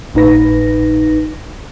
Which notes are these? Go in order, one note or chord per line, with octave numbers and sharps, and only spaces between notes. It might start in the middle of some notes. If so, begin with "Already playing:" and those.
G#1 A2 D#4 B4 A#6